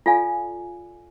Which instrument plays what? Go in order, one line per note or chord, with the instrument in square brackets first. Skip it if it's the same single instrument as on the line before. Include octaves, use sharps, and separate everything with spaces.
[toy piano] F4 A4 D5 F5 G#5